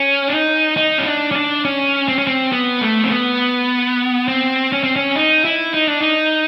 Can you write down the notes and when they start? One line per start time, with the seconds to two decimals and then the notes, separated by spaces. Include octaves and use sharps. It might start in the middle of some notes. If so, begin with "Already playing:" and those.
Already playing: C#4
0.28 D4
0.33 D#4
0.77 D#4
0.98 C#4
1.07 D4
1.31 C#4
1.36 D4
1.65 C#4
2.08 C4
2.18 C#4
2.27 C4
2.53 B3
2.81 A3
3.04 C4
3.11 B3
4.28 C4
4.72 C#4
4.84 C4
4.96 C#4
5.16 D#4
5.45 E4
5.74 D#4
5.87 D4
6.01 D#4